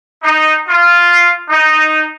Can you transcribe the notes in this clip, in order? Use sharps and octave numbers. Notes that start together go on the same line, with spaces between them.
D#4
F4
D#4